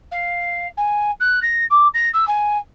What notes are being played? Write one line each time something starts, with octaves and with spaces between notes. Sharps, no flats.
F5
G#5
F#6
A#6
D6
A#6
E6
G#5